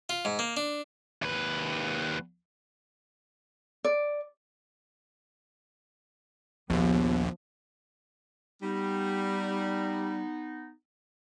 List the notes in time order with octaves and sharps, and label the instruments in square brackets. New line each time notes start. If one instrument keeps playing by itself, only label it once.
[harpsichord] F4
G#2
A#3
D4
[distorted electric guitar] D#2 B4
[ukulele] D5
[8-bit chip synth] A#1 D#2 [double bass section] F3 [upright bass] B3
[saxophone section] G3 [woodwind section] B3 D#4